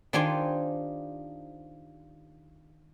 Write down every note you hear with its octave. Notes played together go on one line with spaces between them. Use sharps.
D#3 D4 F4 G4 C5 G#5